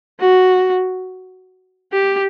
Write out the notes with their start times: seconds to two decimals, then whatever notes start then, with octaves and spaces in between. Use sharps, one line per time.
0.20 F#4
1.93 G4